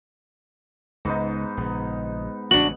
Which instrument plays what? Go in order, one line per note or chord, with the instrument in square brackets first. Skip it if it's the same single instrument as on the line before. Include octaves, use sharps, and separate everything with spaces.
[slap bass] C#2 [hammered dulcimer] G#2 B3 D#4
[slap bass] A#1 C#3 [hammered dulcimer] B3
[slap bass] A1 C#3 [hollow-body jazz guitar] D4 F#4 [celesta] F#7